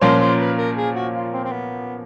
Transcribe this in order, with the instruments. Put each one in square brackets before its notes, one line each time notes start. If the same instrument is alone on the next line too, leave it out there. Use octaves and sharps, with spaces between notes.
[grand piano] A#2 F3 A#3 C#4 [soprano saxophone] C5
[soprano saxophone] C5
B4
A#4
G#4
F#4
F4
C4
C4
B3